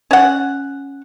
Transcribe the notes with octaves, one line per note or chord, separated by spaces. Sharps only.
C#4 F#5